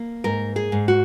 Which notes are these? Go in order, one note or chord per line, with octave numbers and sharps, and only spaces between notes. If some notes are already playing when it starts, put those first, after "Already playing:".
Already playing: A#3
G#2 A#4
G#4
G#2
F#4